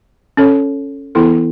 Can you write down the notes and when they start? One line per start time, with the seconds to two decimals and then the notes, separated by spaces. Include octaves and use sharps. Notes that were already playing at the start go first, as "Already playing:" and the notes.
0.37 C#4 A4 C#5
1.15 E3 B3 E4 A4